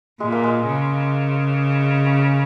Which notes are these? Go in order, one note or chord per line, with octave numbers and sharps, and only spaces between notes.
A#2 G#3
A#3
G#3
C#3
C#4